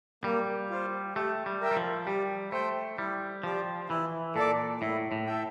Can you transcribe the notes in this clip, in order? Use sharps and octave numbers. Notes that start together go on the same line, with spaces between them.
G3 A#3
F4 C5
A3 G4
G3
A#4 E5 G5
G3
F3
G3 G4
A3 C5 G5
G3 E4
F3 G4 D5
E3 E4
A#2 A4 D5
A2 E4
A2
A4 E5 G5